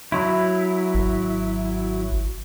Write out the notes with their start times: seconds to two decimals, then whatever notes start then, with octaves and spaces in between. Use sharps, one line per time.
0.12 F#3 E4
0.94 G#1